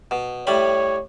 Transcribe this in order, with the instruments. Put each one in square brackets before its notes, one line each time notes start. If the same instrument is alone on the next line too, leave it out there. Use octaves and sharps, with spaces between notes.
[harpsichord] B2
[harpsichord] A2 G3 B5 [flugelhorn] C#5